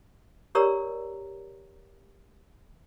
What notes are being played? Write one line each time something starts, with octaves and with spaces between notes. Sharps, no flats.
G4 A#4 C#5 D5 A#5 E6